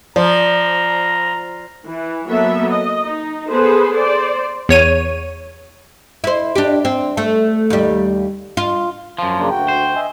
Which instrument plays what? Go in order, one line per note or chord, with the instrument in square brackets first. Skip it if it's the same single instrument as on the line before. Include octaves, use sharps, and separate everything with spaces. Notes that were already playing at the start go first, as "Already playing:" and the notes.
[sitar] F3 [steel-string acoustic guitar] D5 [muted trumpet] A#5
[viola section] E3
F#3 A#3 B3 A4 E5
D#5
D#4
B3 G#4 A4 B4 C5
C5 D5
[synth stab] E2 C#5 D#7
[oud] E4 C5
D4 G4
C4
A3
D#2 G3
F4
[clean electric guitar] F#2 F3
[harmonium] C#3 A#3 D4
D2 F#4 G5
[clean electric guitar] C5
[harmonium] D#5 E5 G#5